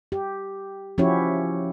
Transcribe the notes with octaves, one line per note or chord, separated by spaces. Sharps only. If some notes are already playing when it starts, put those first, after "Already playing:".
G4
F3 C#4 E4 F#4 G4 C#5